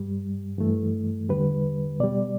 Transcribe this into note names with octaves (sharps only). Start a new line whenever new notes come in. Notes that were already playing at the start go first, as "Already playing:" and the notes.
Already playing: G2 G3
G2 E3 A3
E2 D3 G3 B4
B2 G3 D5